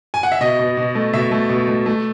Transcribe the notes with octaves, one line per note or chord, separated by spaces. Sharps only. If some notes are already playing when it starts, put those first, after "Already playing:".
G#5
F#5
E5
B2 D#5
B2
B2
A3
B2 E5
A3
B2
A3
A3